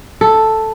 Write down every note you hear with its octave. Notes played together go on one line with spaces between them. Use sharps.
A4